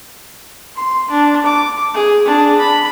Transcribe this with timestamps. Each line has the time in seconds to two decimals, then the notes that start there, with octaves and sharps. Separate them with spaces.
0.76 C6
1.11 D4
1.46 D6
1.94 G#4
2.26 D4 G#4
2.59 B5